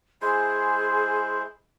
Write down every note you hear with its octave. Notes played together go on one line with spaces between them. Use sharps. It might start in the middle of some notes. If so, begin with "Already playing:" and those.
G#3 E4 G#4 C5